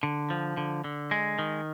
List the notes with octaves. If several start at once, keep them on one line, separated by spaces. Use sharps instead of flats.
D3
F3
D3
D3
G#3
D#3